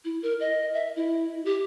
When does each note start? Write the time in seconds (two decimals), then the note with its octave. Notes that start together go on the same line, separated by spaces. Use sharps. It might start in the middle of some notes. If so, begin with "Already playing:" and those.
0.05 E4
0.22 A#4
0.40 D#5
0.74 E5
0.96 E4
1.45 G4